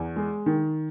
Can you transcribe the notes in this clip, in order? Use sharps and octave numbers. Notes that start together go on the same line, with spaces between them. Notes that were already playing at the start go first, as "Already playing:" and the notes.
Already playing: E2
G#3
D#3